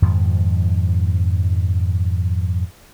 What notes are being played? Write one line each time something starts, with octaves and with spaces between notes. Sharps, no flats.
F2 G#2 D#3 F3